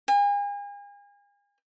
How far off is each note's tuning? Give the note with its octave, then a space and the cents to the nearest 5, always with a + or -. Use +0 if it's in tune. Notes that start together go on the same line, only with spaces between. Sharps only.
G#5 -40